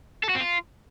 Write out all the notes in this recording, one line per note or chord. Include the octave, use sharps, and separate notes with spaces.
A4
F#4
C4
F4